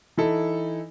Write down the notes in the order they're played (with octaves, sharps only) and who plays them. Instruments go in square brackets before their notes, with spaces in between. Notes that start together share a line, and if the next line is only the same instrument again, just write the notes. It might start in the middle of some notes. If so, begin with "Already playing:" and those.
[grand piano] E3 D#4 E4 A4